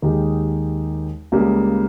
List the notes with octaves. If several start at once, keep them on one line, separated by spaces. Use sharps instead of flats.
D#2 D#3 G#3 D#4 G4
C#2 C#3 G3 A#3